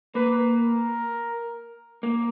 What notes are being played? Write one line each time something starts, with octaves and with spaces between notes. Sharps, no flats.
A#3 B4
A#4
A#3